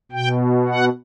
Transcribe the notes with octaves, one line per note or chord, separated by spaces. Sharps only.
B2 G5
F#5